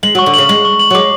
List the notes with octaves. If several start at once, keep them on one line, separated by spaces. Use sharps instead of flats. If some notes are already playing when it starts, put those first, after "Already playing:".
G#3 F#7
F#3 C#6
D3
C#3 F#7
G#3 F#7
C#6
F#7
F#3
G#3 D6